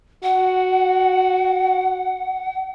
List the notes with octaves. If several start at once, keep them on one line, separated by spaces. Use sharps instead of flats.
F#4 F#5